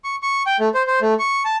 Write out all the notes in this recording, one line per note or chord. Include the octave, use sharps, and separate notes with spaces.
C#6
C#6
G5
A3
C5
C5
A3
C#6
A5